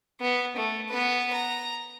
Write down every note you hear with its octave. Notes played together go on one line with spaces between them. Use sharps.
B3
A3
B3 B4
A#5